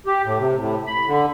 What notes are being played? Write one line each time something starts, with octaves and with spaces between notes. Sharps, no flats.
G4
A2
C3
A2
B5
D3